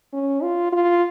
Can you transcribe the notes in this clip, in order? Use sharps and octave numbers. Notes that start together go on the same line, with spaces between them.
C#4
F4
F4